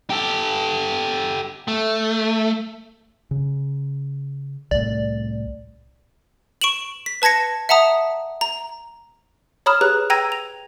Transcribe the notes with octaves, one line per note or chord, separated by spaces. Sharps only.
G4 A4
A3
C#3
C2 A2 D5
C#6 D7 E7 F#7
B6
B4 A5 G#6 A#6 C#7
E5 F#5 A5 A#5 D#6
A#5
C#5 A#5 B5 D#6 F6 E7
G4 G#4 B4 C#5 A#5 F#6
G5 A#5 E6 G#6 A#6 D#7
F7